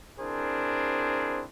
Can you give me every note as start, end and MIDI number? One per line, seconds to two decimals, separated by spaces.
0.20 1.44 60
0.20 1.44 62
0.20 1.44 64
0.20 1.44 68
0.20 1.44 70
0.20 1.44 72